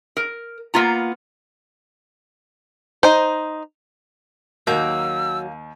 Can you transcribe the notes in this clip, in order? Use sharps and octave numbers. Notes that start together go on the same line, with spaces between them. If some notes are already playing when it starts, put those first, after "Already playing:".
A#4
A#3 B3 F4 A#5
D#4 C5
D#2 F#3 A#3 D6 E6 G6